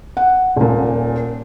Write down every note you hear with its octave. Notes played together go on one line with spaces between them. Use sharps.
F#5
D#1 A#2